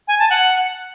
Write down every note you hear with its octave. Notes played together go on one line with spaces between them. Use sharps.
G#5
A5
F#5